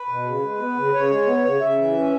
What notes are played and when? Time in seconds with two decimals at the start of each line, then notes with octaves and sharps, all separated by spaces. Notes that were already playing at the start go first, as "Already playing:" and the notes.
Already playing: B4
0.09 B2
0.26 C#3
0.42 G#3
0.60 B3
0.77 C#3
0.94 C#3 C#5
1.10 G#3
1.27 B3
1.45 C#3
1.61 C#3 E5
1.78 E3
1.95 C#4